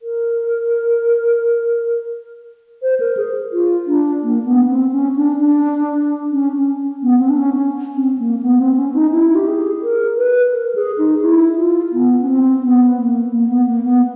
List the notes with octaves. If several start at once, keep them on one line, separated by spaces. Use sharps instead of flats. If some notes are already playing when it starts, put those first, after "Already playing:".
A#4
C5
A#4
G#4
F4
D4
A#3
B3
C4
C#4
D4
D4
C#4
C#4
B3
C4
D4
C#4
C#4
C4
A#3
B3
C4
C#4
D#4
E4
G4
G#4
A#4
B4
A#4
G#4
D#4
E4
F4
B3
C#4
C4
B3
A#3
A#3
B3
A#3
B3